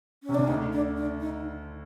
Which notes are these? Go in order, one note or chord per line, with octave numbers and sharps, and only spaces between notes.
C#4
C3
C#3 D4
D2 D3 D#4
D4
D4
D#4